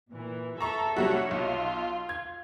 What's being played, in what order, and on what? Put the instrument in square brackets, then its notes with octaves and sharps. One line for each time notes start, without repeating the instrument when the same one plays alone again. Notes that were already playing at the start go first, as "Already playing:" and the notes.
[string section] A#2 E3
[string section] A4 E5 [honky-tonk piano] A#5 C#6
[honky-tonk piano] F#3 G3 F#4 [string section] D4 C#5 E5
[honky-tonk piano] B1 [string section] F4
[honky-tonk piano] G#6